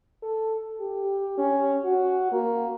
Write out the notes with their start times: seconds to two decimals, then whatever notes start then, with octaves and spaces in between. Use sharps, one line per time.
0.23 A4
0.80 G4
1.38 C#4
1.85 F#4
2.32 A#3